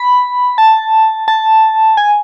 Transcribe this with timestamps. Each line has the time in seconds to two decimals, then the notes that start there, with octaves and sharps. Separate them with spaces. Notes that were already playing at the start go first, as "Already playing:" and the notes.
Already playing: B5
0.58 A5
1.28 A5
1.97 G#5